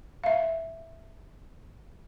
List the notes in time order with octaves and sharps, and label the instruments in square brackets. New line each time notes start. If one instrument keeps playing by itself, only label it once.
[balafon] E5 F5